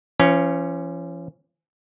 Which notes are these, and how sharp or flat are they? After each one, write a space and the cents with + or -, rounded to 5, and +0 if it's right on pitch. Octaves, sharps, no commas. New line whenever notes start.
F3 -45 C#4 +0